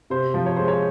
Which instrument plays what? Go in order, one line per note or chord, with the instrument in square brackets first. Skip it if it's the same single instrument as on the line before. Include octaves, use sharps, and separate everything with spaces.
[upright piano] C3 C5
F3
C#5
G#3 C5
C#5